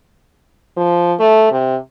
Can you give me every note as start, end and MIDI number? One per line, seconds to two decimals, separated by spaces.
0.77 1.14 53
1.19 1.49 57
1.51 1.76 48